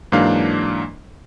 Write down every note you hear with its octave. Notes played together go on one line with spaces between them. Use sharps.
G#2 E3 F#3 A#3 D4 F5